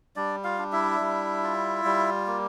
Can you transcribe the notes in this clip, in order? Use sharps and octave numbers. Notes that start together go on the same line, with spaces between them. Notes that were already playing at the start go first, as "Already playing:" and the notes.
G3 D4 D5
F4 F5
D4
E4 E5
G3
F4
G3
A#3